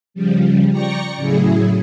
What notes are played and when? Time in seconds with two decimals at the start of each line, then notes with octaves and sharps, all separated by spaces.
0.14 C#3 F3 G3
0.70 D5 G5 A#5 C#6 A#6 C#7
1.16 A2 C#3 F#3 E4 G#4